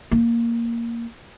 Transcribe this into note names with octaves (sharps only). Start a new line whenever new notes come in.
A#3